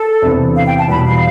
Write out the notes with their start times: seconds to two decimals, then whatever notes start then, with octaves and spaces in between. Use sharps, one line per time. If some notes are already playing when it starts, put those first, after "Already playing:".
Already playing: A4
0.22 E2 C3 E3 B3 D4
0.55 F5
0.66 G5
0.78 A5
0.88 E2 B2 G3 B5
1.05 F5